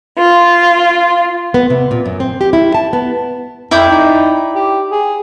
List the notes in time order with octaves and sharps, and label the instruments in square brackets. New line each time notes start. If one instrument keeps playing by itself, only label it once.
[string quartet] F4
[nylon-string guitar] B3
C3
A#2
F#2
C4
G4
E4
A5
B3
[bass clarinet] F2 [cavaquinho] E4 D5 G5
[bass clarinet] D#4
G4
G#4